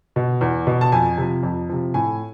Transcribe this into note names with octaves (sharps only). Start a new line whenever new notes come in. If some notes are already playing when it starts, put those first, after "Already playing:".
B2
E2
B2
A5
F2 G#5
C3 F3
F2
C3 F3
A2 G#5